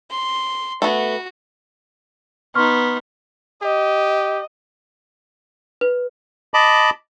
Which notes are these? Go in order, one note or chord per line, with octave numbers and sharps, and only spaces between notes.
C6
A3 B3 F#4
B3 D#4 C6 C#6 F6
G4 D#5
B4
D#5 A5 B5 D6